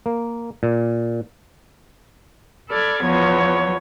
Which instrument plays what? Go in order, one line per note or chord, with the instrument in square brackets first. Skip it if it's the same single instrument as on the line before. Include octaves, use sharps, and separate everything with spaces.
[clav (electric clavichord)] A#3
A#2
[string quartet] A4 D5 B5 F6 G#6
E2 F3 B3 C#5